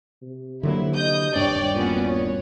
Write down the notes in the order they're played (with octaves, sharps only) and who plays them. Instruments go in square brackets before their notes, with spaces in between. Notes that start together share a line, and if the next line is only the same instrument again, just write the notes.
[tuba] C3
[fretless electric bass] D3 F#3 A#3 [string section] E4
[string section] D#5 D#6 G6
[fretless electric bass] D#1 G2 D4 [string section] C#5 D5 G5
[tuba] A#2 [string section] B3 C#4 F#4
[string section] C#5